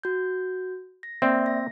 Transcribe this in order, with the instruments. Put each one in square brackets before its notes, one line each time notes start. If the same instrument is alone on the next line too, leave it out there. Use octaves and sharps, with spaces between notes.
[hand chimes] F#4 G6
A#6
[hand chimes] A#3 D5 E5 [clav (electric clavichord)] C4
[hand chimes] A#6